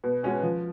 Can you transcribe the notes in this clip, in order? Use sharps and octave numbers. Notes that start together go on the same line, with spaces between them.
B2
G#3 C#4 F#4
F3